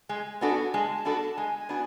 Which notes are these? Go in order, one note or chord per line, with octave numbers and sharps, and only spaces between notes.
G#3 G#5
B3 D4 F#4 A4 G#5
G#3 A5
B3 D4 F#4 A4
G#3 G#5
G#5
B3 D4 F#4